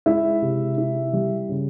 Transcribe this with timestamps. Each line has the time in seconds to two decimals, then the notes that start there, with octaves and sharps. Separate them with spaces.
0.06 G#3 E4 E5
0.42 C3
0.78 E4
1.13 G3
1.49 C#3